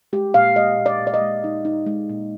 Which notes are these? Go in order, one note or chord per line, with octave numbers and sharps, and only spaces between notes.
G#3 G4
A#2 F5
G#3 D#5
A#2
D5
A#2
D5
D#5
G#3
D#4
D#4
G#3
A#2